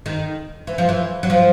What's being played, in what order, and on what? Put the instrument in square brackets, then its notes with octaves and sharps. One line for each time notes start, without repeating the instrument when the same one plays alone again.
[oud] D#3
E3
F3
E3
F#3
F3